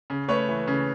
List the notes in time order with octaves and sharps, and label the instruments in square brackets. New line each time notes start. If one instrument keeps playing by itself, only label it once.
[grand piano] C#3
A3 B4 C#5
E3
C#3